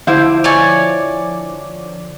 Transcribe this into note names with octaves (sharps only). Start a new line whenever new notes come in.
D3 F3 E4 C5 F5 D6
C#5 D5 G#5